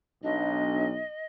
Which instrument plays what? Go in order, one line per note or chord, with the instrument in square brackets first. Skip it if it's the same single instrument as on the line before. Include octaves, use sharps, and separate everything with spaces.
[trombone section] B1 [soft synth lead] D4 [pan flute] D#5